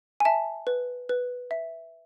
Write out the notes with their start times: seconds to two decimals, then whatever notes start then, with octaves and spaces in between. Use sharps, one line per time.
0.20 G#5
0.25 E5 A5
0.67 B4
1.09 B4
1.51 E5